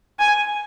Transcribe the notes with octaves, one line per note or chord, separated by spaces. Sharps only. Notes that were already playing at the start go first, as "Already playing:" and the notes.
G#5